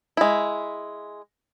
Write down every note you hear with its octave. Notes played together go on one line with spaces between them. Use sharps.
G#3 E4